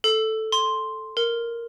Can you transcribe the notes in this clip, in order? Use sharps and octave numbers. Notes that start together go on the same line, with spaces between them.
A4
C6
A#4